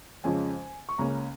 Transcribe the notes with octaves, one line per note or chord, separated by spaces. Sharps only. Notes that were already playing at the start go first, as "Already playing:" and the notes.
F2 C#3 F3 G#3 C#4 G#5
C#6
C#2 C#3 A#3 C#4 A#5